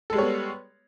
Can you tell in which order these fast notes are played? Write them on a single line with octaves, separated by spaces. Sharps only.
A4 G#3 G3 C#5 B3